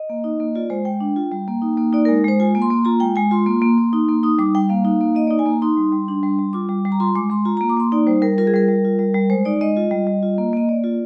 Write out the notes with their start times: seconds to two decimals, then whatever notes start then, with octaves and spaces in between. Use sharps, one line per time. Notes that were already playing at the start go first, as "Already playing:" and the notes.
Already playing: D#5
0.09 A#3
0.24 D#4
0.40 A#3
0.55 F4 D5
0.70 G#3 C5
0.85 G#3 G5
1.00 D4
1.16 F4
1.32 G3
1.48 A#3
1.62 D#4
1.77 A#3
1.93 D#4 D5
2.05 G#3 A#4
2.24 G#3 C5
2.40 F4 G#5
2.55 A#3
2.62 C6
2.71 A#3
2.85 F4 A#5
3.00 G#3 G5
3.16 G#3 G#5
3.31 F4 C6
3.46 A#3
3.62 A#3
3.78 A#3
3.93 D#4
4.09 A#3
4.23 D#4 D#6
4.39 G3 D6
4.55 G3 G5
4.69 A#3 F5
4.85 D#4
5.01 A#3
5.15 A#3 D#5
5.27 D#4 D5
5.39 G#5
5.46 A#3 A#5
5.62 D#4 C6
5.77 G3
5.92 G3
6.08 D4
6.23 G3
6.39 G3
6.53 F4 D6
6.69 G3
6.85 G3
6.92 A#5
7.00 F4 C6
7.15 G#3 D6
7.30 G#3 C6
7.45 F4 A#5
7.57 A#3 A#5
7.69 D6
7.77 A#3 C6
7.92 D#4 D5
8.07 G3 C5
8.22 G3 A#4
8.38 F4 A#4
8.47 G#4
8.54 G3 A#4
8.68 G3
8.85 F4
8.99 G3
9.14 G3
9.30 G#3 C5
9.45 D#4 D5
9.61 G#3 D#5
9.77 F4
9.91 G3
10.07 G3
10.23 F4
10.38 A#3
10.53 A#3 D#5
10.69 A#3 D5
10.84 F4